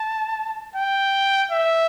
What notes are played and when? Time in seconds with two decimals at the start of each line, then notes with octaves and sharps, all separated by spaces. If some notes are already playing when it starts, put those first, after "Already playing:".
Already playing: A5
0.75 G5
1.51 E5